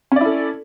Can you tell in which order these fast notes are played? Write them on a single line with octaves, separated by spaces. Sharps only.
C#4 D5 E4 A4